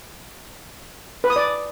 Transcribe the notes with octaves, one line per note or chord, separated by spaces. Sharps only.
B4
D#6
D5